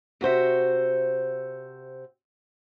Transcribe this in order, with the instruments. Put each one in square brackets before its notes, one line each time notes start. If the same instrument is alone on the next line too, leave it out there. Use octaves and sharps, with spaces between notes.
[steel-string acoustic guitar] C3 F#4 C5 E5